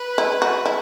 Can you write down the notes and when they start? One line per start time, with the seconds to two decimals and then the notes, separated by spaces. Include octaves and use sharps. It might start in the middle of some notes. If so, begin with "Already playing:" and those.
Already playing: B4
0.18 E4
0.42 F#4
0.66 E4